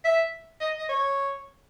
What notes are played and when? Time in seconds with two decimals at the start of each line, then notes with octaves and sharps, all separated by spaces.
0.04 E5
0.61 D#5
0.79 D#5
0.89 C#5